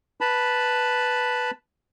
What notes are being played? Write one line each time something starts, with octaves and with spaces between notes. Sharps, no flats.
B4 A5 B5